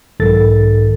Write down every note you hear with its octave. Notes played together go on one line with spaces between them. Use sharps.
B1 G#2 D#3 A4 A6